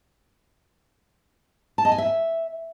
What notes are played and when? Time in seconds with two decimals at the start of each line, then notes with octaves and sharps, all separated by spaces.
1.78 A5
1.85 D#5
1.92 G#5
1.98 E5